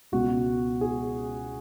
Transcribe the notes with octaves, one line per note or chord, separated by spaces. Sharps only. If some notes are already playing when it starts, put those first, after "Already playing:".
C#2 B2 F#4
G#4